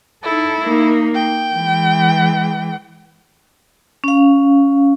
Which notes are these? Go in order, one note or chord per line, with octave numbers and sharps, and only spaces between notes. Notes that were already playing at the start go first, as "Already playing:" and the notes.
D#4 E4 A4
A#3 D#4
G5
E3 G#3
C#4 F5